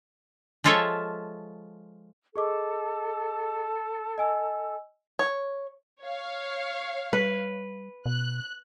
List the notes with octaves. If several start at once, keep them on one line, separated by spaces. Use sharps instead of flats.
F3 G#3 F4 A4 C#5 E5
G#4 A4 D#5 D6
D#5 G#5 E6
C#5
C#5 F5
G3 B4
B2 F#6